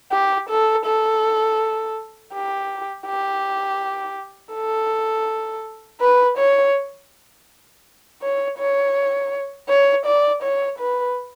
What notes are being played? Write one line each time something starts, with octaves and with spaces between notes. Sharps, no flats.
G4
A4
A4
G4
G4
A4
B4
C#5
C#5
C#5
C#5
D5
C#5
B4